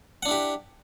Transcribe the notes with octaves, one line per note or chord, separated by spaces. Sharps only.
D4 E4 G4 F#5